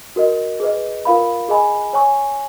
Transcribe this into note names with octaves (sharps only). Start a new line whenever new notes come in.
F#4 A#4 D#5
G#4 B4 D#5
F4 A#4 F5 B5
G#4 D#5 G#5 B5
C#5 G#5 C#6